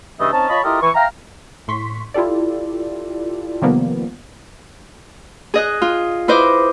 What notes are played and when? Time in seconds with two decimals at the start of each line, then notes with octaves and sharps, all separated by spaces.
0.20 G2 C#3 E3 A3 D#5 E5
0.33 C4 C#4 D#4 A5
0.50 F4 C#5 D#5 A5 B5
0.64 E4 F4 G4 A4 A#4 D#5
0.82 E3 C#6
0.95 E5 F5 G5 A#5
1.68 A2 C6 C#6 B6
2.14 E4 F4 G4 A4 D5
3.62 C3 D#3 F3 G3 A#3 B3
5.54 G#4 D#5 F#6
5.82 F4
6.28 E4 B4 C5 D#5 D6